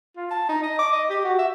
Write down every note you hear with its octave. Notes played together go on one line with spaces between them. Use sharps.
F4
A5
D#4
D#5
D6
D#5
G4
F#4
E5